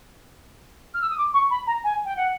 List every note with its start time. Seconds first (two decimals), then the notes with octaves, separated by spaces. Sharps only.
0.94 F6
1.01 E6
1.10 D#6
1.18 D6
1.33 C#6
1.50 B5
1.66 A#5
1.84 G#5
2.05 G5
2.16 F#5